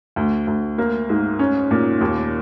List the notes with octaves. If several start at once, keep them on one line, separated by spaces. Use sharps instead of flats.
D2
D2
A#3
G#2
C#4
A#2
D#2